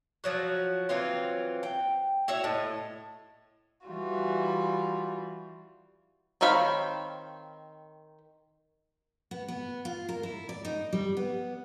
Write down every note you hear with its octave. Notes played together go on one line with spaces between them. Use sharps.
F3 F#3 F#4
E3 F#3 C4 F4
G5
E4 F#4 C#5 E5
A2 D#5
E3 G3 F4 F#4
D#3 C4 C#5 F5 B5
B3
B3
F4
A#4
E4
D5
D#4
G3
B3